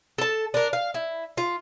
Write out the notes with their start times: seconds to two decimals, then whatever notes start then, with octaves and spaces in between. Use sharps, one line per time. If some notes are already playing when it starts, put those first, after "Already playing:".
0.18 A4 A5
0.54 D4 A#4
0.73 F5
0.94 E4
1.38 F4